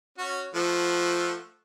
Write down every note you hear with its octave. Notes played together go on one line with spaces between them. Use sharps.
C#4 F#4
F3 A3 F#5